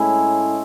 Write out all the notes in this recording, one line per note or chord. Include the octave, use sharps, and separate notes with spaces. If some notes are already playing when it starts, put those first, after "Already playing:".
Already playing: A2 G#3 C#4 E4